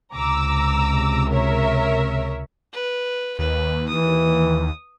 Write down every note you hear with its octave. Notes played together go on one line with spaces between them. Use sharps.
C#2 C3 A#5 D6 E6
A#4 C#5 E5
B4
D#2 B4
E3 D#6